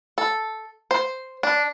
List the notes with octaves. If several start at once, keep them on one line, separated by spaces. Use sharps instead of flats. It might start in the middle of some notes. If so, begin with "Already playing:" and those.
A4
C5
D4